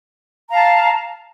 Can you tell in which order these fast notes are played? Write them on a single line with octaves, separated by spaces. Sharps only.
A#5 F5 A5